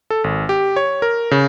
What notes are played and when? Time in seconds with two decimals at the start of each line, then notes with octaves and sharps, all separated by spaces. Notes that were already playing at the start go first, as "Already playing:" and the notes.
0.10 A4
0.24 G#1
0.49 G4
0.76 C#5
1.02 A#4
1.31 C#3